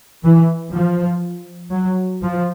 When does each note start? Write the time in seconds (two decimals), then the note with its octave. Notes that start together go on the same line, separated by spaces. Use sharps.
0.24 E3
0.73 F3
1.72 F#3
2.22 F3